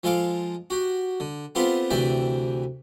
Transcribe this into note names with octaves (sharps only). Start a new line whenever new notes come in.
F3 G#3 A4 F5 D6
F#4 G4
D3
B3 C4 F4 G4 A4 B4
D2 C3 E3 D5 E5 G5